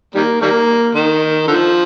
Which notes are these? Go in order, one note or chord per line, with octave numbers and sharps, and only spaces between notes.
D#3 G3 A#3
D#3 G3 A#3
D#3
D3 F3